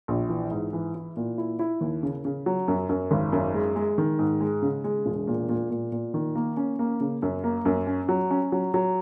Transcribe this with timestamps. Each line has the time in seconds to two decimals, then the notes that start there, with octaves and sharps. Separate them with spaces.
0.08 A#1
0.29 E3
0.51 G#2
0.73 E3
0.95 E4
1.17 A#2
1.38 E4
1.59 E4
1.81 D#2
2.03 C#3
2.25 C#3
2.46 F#3
2.68 F#2
2.89 F#2
3.11 G#1
3.33 F#2
3.54 G#3
3.76 G#3
3.98 D#3
4.19 G#2
4.41 G#3
4.62 C#3
4.84 G#3
5.06 E1
5.27 A#2
5.49 A#2
5.70 A#2
5.92 A#2
6.14 D#3
6.35 A#3
6.57 C#4
6.79 A#3
7.00 C#3
7.22 F#2
7.44 A#3
7.65 F#2
7.87 C#4
8.09 F#3
8.31 C#4
8.52 F#3
8.74 F#3